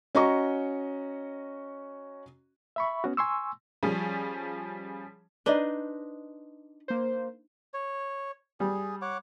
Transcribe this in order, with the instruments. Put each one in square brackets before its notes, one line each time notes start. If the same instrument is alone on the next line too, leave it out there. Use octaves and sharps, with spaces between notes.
[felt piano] C#4 F#4 D#5 A#5 C#6
[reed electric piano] E5 B5 C#6
B3 C#4 F#4
G#5 C6 C#6 E6
[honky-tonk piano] F3 G3 C#4 G#4
[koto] D4 D#4 C5 [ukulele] B4 D#5
[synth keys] A#3 C5
[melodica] C#5
[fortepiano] G3 [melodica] G#4
[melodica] C#5 F#5 D6